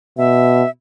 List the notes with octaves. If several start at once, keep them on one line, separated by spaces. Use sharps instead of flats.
B2 E5